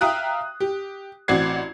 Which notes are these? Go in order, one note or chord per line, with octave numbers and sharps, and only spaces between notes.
E5 F5 G5 A#5 D#6 F#6
G4
A1 C4 F#4 D5 G#6 C7